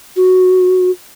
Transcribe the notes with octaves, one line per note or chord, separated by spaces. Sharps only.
F#4